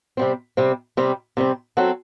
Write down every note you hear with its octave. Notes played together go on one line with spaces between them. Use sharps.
C3 G3 C4
C3 G3 C4
C3 G3 C4
C3 G3 C4
F#3 C4 F#4 A4